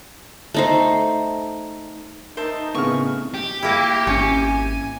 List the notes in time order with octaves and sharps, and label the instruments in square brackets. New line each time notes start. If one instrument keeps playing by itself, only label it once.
[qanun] A3 D#4 C5
[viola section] D#4 [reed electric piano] A#4 [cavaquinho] C5 E5 A5
[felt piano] A2 C#3 F6 [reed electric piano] B3 C4 [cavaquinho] C#6
[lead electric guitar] G4
[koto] A#3 E4
[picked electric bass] G#1 C#4 [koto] C#5 [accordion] G#5